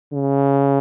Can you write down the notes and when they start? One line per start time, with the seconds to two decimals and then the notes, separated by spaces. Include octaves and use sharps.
0.14 C#3